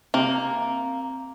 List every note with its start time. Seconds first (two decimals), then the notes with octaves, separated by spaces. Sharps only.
0.14 C3 A#3